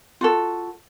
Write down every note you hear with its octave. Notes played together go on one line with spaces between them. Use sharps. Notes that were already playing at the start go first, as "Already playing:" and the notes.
F4 F#4 A4